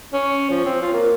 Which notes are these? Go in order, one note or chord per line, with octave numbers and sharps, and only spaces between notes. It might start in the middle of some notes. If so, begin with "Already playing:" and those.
C#4
F3
C4
F4
A#3